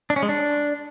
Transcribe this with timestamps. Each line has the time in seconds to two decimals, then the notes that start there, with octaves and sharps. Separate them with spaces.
0.10 D4
0.16 C#4
0.23 G#3
0.29 D4